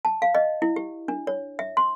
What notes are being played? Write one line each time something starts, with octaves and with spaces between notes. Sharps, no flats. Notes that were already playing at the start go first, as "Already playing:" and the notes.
A5
F5
D#5
E4
G4
D4
C#5
E5
C6